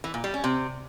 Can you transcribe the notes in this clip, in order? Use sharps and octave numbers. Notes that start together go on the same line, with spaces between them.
E3
A#2
G3
C#4
C3